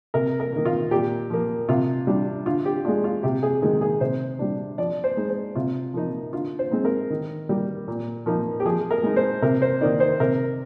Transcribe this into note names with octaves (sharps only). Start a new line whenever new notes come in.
C3 A#4
A#4
D#3 A#3
F4
A#2 G4
F3 A#3
C3 F4
G3 D4
D3 F4
G4
G#3 D4 F4
F4
C3 G4
G#4
D#3 G#3 G#4
G#4
C3 C5
G3 D4
F3 D5
C5
G#3 D#4
C5
C3 F4
F3 A#3 D#4
D3 F4
C5
G#3 C4 D#4
A#4
D#3
G3 A#3
A#2
F3 A#3 D#4
G4
F3 G#4
A#4
G#3 D#4
C5
C3 A#4
C5
D#3 A#3 D#4 D5
C5
C3 A#4